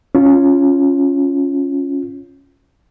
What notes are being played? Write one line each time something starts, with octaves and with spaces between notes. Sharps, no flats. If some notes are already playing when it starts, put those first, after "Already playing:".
C#4 F4